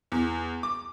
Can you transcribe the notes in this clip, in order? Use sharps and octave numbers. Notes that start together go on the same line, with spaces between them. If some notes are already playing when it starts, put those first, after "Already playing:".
E2
D6